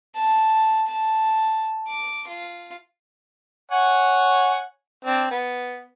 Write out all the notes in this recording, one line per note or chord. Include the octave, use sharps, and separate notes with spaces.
A5
A5
D6
F4
C#5 F#5 G#5
C4 D4
B3